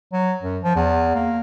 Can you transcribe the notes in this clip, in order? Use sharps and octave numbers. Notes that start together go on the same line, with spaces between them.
F#3
F#2
F3
E2
A#3